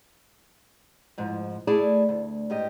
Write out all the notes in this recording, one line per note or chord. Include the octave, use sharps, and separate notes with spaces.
F2 G#2 F3
A3 E4 G#4 D5 A5
D2
G#2 G4 D#5